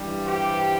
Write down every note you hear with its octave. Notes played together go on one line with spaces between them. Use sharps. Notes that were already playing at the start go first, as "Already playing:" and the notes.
Already playing: G2 E3 G3
G4 C5